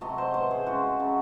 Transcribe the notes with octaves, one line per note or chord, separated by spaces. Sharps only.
C3 F#3 A3 D#5
C5
A2 E3 A3 C5
G#4
C#3 G#3 F#4
C#3 F#3 A3